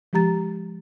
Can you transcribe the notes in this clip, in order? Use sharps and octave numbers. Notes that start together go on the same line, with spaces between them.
F3 G#3 G4 A#5 A6